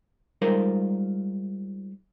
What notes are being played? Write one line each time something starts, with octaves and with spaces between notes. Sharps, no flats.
G3 G#3 D#4 F4 A#4 C5